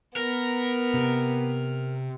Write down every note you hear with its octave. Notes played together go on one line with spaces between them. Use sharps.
B3 A#4
C3